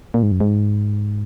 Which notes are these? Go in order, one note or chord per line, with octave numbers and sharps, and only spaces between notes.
A#2
G#2
F#2
G#2